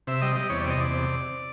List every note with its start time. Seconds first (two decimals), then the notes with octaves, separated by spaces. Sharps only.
0.07 C3 E5
0.22 G3 D#5
0.35 G3 D#5
0.50 E2 C#5
0.61 C3 D5
0.70 D#5
0.77 E2 D5
0.91 C3